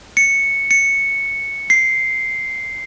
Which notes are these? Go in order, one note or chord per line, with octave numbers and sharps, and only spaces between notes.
C#7
C#7
C7